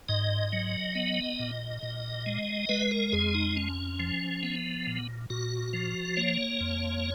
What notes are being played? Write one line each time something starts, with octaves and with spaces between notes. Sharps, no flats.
G#2 D#5
F#3
B3
A#2
A#2
G#3
G#3 B4
A#4
F2 G#4
D#4
C#4
F3
B3
A#2
A#2 F#4
F3
A#3 C#5
F2